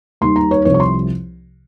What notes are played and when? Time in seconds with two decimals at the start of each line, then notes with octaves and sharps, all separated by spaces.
0.21 D#2 D#3 G3 C6
0.36 A#5
0.51 C#5
0.65 C2 C3 F3 C#5
0.74 C#6
0.80 C6